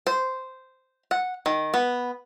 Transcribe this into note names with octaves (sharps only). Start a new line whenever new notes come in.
C5
F#5
D#3
B3